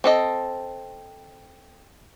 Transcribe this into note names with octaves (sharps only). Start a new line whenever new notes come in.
C4 A4 D#5